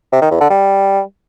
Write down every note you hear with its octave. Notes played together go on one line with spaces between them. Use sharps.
C3
D#3
E2
D3
G3